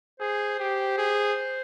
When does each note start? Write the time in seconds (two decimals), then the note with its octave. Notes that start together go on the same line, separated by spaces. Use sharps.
0.20 G#4 C5
0.60 G4
0.98 G#4